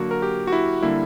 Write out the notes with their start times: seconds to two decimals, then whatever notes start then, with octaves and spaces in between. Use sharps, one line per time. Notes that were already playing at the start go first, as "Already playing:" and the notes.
Already playing: D3 F#3 A#3 F#4
0.11 A#4
0.22 G4
0.47 F#4
0.52 E4
0.83 D3 G3 A#3 E4